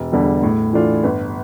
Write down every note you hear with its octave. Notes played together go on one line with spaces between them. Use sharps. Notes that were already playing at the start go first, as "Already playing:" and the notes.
Already playing: E1
E2 D3 G3
A2
E3 A3 D4 F4
G1